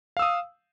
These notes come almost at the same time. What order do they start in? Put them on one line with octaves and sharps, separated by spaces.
F5 E6 D#6